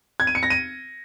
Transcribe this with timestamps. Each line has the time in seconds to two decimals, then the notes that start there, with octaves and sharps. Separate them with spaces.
0.20 G#6
0.27 D#7
0.35 C#7
0.43 A#6
0.50 D#7